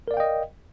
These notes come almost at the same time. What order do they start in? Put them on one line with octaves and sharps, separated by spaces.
A#4 D5 F5 G5 D#5